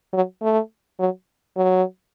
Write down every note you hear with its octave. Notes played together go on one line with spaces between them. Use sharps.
F#3
A3
F#3
F#3